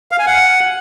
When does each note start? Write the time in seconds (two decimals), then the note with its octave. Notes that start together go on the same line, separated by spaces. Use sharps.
0.12 F5
0.19 G#5
0.26 F#5